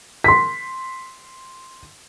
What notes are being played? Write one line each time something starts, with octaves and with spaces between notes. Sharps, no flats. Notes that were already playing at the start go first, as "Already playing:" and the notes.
C6 B6